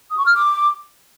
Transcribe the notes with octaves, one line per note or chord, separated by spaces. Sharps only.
D#6
C#6
F6
D6